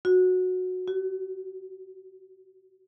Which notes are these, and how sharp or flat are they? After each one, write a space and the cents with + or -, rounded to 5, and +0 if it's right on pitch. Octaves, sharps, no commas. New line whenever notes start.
F#4 -10
F#4 +45